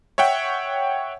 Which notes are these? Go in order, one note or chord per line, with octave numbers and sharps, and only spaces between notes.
C#5 E5 F#5 G5